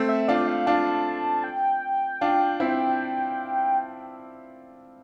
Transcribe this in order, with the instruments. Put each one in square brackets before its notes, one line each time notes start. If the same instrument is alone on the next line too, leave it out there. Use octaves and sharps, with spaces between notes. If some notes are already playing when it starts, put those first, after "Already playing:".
Already playing: [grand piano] A3 C4
[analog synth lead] E5
[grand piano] D4 F4 [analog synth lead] D5
[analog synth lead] F5
[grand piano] D4 F4 [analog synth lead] A5
[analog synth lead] G5
[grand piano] D4 F4
C4 E4